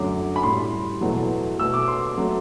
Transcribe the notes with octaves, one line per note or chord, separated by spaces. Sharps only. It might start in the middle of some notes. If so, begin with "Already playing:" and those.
Already playing: F#2 D3 F#3 A3 D6
B5
A2 G3 C6
E2 B2 F#3 A3
B2 A3 E6
D6
C6
F#3 A3